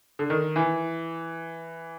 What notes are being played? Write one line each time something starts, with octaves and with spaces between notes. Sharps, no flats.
D3
D#3
E3